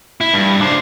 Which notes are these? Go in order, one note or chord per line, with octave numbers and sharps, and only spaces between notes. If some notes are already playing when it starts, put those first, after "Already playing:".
E4
G2
D4 C5